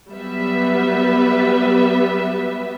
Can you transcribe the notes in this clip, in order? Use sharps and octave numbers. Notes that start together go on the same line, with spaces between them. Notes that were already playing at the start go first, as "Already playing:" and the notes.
F#3 G3 B3 B4 E5